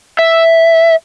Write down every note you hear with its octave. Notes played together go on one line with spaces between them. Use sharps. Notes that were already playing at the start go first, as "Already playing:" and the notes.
E5